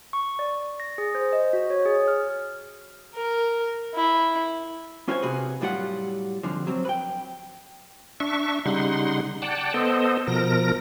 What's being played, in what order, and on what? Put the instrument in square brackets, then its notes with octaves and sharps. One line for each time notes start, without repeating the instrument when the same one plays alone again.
[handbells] C#6
D5
A#6
G#4
C5
D#5
F#4
C#5
G#4
F6
[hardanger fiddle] A#4
E4
[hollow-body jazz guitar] C#4 F4 F#4 C5 E5 G#5
C3 F#4 G#4 B4
A2 F#3 G3 F4 G4 F#5
F2 G#2 D3 F3
F#3 C4
B4 G5
[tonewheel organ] D4 E5 C#6
C#3 G3 D#4 F#5 C6
D5 F#5 G5 A5
B3 A4 C5 D#5
B2 F3 A#4 A#6